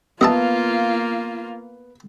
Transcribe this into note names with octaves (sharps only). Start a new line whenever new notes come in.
A#3 B3 F4 D#5 E5 A5